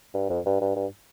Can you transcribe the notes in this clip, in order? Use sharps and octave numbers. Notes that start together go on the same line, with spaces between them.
G2
F2
G2
G2
G2